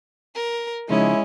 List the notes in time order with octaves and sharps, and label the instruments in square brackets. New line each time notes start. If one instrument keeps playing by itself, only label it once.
[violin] A#4
[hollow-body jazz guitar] C#3 F3 D#4 [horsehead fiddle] G#3 [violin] C#4 [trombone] E4